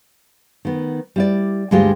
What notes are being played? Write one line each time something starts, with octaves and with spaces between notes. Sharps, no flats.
D#3 B3
G3 E4 D5
D2 G2 G#3 F4 G4 G5